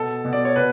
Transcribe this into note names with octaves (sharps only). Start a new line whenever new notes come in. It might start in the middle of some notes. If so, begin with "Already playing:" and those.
Already playing: B2 A4
B2
D5
C#5
B2 B4